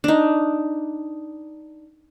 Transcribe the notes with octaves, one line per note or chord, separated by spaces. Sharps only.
D4 D#4